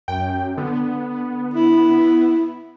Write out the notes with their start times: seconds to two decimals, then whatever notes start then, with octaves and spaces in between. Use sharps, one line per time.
0.08 F#2 G5
0.57 D3 B3
1.54 E4